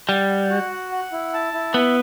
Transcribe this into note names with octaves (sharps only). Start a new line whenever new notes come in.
G3 F#5
F#5
F#4
F#5
F#5
E4
A5
E4
B3 B4